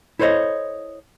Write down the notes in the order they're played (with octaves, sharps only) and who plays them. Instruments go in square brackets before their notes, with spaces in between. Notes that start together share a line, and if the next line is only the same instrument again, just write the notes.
[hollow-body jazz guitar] E4 A4 C5 C#5 D#5